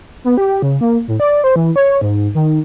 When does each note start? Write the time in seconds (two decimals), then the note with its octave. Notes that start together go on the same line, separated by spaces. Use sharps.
0.24 B3
0.37 G4
0.62 C#3
0.81 A#3
1.08 A2
1.20 D5
1.44 C5
1.56 E3
1.76 C#5
2.01 G#2
2.35 D#3